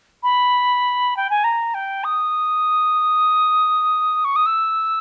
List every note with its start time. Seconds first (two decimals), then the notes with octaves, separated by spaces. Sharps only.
0.23 B5
1.17 G5
1.30 G#5
1.44 A#5
1.74 G5
2.04 D#6
4.25 C#6
4.36 D#6
4.46 E6